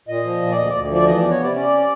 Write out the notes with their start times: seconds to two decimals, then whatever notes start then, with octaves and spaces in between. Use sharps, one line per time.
0.08 A#2 D#5
0.24 F3
0.42 A#2
0.52 D5
0.57 D2 D#5
0.69 D2 D5
0.90 F3 D5
1.07 E3 D#5
1.18 B3 D5
1.31 C#5
1.40 C3 D5
1.55 C#4 D5